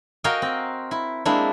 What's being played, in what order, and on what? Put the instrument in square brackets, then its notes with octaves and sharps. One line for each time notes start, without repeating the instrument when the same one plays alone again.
[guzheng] F#4 A#4 D#5 F5 G5 G#5
C4
E4
G#3 A#3 C4 D4 E4